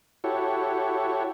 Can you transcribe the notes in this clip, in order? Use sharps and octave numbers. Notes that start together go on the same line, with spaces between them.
E4 F#4 G4 A4 C#5